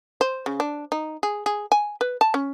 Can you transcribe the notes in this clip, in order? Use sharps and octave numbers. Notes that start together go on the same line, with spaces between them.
C5
C#3
D4
D#4
G#4
G#4
G#5
B4
A5
C#4